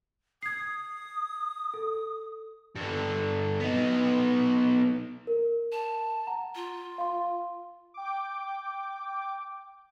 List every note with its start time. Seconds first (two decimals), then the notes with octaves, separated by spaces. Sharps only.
0.43 D#6 G#6 C7
1.74 A4
2.75 G2 D3
3.60 B3 D#4
5.27 A#4
5.72 A5
6.27 F#5 A#5
6.55 F4
6.98 F5 C6
7.94 G5 D6